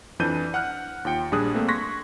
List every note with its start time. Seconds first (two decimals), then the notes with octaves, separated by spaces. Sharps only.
0.19 F2 E3 D4 G6 D#7
0.54 F#5 F6 F#6
1.05 D#2 F4 G5 C#7
1.32 A#1 G3 D4 G#4 D#6 F#6
1.54 A3 A#3 C4
1.68 C6 C#6 F#6 G#6 A#6 B6